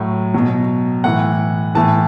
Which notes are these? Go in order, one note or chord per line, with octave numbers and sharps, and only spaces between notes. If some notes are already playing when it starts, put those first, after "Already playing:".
Already playing: A2 F#3
B2 F#3
A2 E3 F#5
A2 E3 A5